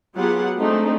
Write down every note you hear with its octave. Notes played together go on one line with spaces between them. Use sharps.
F#3 B3 F4 G4 G#4 F#5
G#3 A3 C4 D4 D#4